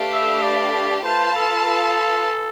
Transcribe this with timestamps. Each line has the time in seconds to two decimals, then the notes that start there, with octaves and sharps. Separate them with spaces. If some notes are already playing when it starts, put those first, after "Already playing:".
Already playing: A3 D4 G4 B4 F5
0.13 E5
0.42 D5
1.04 F4 B4 C5 F5 A5
1.35 A4
1.66 A4